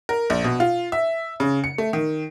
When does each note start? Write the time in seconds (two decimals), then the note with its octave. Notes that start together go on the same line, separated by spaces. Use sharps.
0.09 A#4
0.30 A#1
0.44 B2
0.60 F4
0.92 E5
1.40 C#3
1.64 C#7
1.78 A3
1.93 D#3